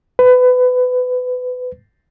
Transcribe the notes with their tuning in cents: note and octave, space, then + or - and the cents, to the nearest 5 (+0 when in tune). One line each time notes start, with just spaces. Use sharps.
B4 +25